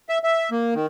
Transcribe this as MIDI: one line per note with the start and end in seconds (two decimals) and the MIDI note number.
0.09 0.18 76
0.24 0.50 76
0.51 0.74 58
0.74 0.86 51